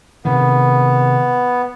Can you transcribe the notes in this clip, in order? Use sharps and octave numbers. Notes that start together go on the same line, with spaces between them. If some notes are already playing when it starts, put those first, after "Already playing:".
C3 D#3 B3